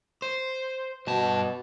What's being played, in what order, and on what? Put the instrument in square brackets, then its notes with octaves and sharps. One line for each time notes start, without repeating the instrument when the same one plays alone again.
[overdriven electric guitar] C5
[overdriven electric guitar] G2 A5 [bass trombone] B2